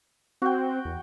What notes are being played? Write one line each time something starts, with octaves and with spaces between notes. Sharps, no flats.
C4 F#4 G5
E2